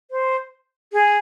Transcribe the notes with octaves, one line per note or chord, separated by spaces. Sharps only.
C5
G#4